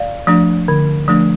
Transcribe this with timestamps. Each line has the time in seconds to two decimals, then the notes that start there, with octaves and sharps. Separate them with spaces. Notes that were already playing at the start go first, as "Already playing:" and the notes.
Already playing: D5 F5
0.27 F3 A3 D4
0.68 D3
1.08 F3 A3 D4